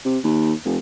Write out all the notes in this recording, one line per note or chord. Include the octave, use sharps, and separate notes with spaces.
C3
D#2
F1